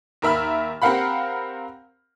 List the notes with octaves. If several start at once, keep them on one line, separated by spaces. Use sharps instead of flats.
D#2 A#4 E5 B5 F6
C4 G4 A#4 F5 F#5 B5